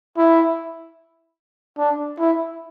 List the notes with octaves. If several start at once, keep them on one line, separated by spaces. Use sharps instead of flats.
E4
D4
E4